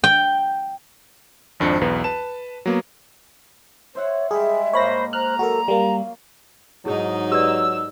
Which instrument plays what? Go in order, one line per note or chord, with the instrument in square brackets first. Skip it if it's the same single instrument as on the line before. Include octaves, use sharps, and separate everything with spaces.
[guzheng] G5
[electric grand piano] G#1 F2 D4 C5 C#7
B1 E2 B4
B4 A5 E7
F#3 A#3 B3
[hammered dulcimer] C5 E5 F#5 [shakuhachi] C#5
[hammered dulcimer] G3 G#3 [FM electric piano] G#4 [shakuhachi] E5
[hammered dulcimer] G#2 A#3 [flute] C5 [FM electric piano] C#5 B5 A#6
[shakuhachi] C5 [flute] A#5 [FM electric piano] F6 F#6
[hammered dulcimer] F#3 [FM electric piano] F#4 A#4 [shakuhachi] A4
[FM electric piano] G3 A#3 [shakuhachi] F5
[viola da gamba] G#2 D#4 [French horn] F#3 [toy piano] E4 G#4 C#5
[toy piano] G4 B4 D5 [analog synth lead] E6